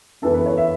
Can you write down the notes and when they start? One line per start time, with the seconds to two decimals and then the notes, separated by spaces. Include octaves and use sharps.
0.22 F#2 E3 B3 A4
0.34 B4
0.46 C#5
0.58 E5